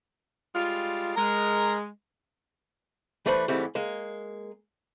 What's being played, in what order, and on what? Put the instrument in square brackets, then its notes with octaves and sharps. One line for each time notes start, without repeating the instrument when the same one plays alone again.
[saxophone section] G3 G#3 F4
[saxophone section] G#3 [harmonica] A#4 A#5
[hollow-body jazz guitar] E3 G3 A3 B4 C5 B5
G#2 E3 G3 A3 C4 G4
G#3 A#3